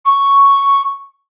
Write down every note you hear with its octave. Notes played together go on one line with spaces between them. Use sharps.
C#6